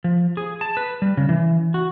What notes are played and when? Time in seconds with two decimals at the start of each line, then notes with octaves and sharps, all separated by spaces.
0.04 F3
0.37 G#4
0.61 A5
0.77 B4
1.02 G3
1.17 C#3
1.29 E3
1.74 F#4